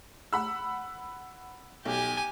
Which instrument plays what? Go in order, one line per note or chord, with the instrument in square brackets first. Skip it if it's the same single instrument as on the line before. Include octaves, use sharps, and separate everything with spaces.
[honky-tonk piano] F#5 B5 E6
[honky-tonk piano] B1 [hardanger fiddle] G4 G#5